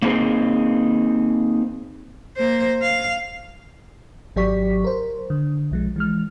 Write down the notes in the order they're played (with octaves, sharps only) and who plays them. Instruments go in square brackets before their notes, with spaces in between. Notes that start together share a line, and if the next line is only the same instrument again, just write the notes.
[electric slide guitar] A#3 C4 D#4 G#4 C5
[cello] A#3 C5
F5
[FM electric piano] G#1 F#3 G4 D5 C#6 B6
A#4 C5
D3
B1 F3 G#3
E3 G#3 F6